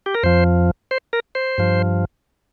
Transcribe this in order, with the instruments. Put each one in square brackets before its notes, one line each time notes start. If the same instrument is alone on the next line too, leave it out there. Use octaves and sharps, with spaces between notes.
[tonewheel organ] G4
A#4
F2 F3 C5
C5
A#4
C5
G2 F3